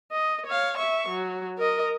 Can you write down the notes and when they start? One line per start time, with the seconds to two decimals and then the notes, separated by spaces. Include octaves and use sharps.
0.12 D#5
0.46 C#5 F5
0.78 E5 C#6
1.09 F#3
1.58 A#4 D#5